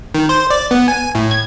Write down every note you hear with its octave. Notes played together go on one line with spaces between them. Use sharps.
D#3
C5
D5
B3
G#5
A2
G#6